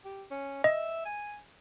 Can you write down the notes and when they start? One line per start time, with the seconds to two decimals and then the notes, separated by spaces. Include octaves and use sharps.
0.05 G4
0.31 C#4
0.64 D#5 E5
1.05 G#5